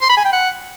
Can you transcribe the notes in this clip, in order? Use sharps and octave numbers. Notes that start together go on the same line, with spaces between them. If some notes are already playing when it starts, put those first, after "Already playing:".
C6
B5
G#5
G5
F#5